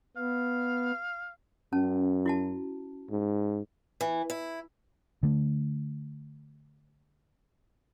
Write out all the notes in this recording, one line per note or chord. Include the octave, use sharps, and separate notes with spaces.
B3 F5
F#2 C#4 A5
E4 F#4 A5
G#2
E3
E4
D3 A3